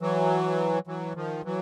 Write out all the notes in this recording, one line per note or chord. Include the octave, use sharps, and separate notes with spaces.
E3 F#3
E3 F#3
D#3 F3
E3 F#3